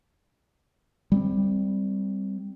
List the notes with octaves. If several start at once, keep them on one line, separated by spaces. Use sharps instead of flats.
G3 B3 C4